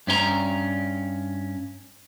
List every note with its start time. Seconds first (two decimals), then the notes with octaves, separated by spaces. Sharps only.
0.07 G2 C#4 A#4 A#5